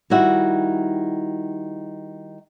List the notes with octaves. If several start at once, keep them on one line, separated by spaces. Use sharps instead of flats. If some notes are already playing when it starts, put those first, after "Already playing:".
D#3 G3 E4 F#4